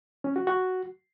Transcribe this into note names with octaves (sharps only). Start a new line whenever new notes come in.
C#4
F#4
F#4